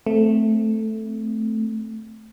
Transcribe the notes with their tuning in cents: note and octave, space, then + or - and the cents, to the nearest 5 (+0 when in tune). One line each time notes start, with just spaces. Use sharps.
A3 +0 C4 -5